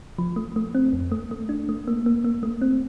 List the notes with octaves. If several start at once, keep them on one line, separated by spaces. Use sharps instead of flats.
F3
A3
A3
C4
F2
A3
A3
D4
A3
A#3
A#3
A#3
A3
C4